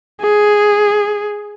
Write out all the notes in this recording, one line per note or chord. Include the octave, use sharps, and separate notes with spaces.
G#4